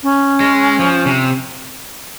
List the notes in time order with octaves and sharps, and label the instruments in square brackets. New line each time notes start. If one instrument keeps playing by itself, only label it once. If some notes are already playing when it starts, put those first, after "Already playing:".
[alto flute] C#4
[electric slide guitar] G#3
F3
C3